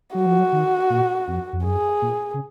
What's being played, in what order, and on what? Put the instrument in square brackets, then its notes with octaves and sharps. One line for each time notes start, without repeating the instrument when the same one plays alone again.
[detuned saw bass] F#3 [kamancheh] F#4
[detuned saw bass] F3
F#3
D#3
A#2
F2
F2
[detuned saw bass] F#2 [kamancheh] G#4
[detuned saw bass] A#2
C#3